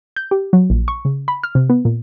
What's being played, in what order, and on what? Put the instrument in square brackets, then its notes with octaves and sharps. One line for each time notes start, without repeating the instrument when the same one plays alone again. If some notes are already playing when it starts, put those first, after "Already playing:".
[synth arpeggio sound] G6
G4
F#3
A#1
C#6
C#3
B5
F6
C3
B3
A#2